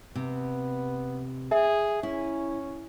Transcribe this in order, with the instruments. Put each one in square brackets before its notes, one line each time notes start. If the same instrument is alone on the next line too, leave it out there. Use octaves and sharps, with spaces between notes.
[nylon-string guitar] C3 [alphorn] B3
[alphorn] G#4 [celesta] E5
[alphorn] C#4 [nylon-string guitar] E4